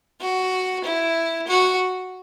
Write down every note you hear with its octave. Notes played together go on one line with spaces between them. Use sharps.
F#4
E4
F#4